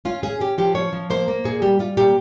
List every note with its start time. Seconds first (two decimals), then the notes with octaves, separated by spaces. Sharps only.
0.05 C#4 F4
0.23 C#4 G#4
0.40 C#4 G4
0.58 F3 G4
0.75 C#4 C#5
0.93 F3
1.10 A#3 C5
1.28 A#3
1.44 A#2 G#4
1.62 G3 G4
1.79 G3 F4
1.97 A#2 G4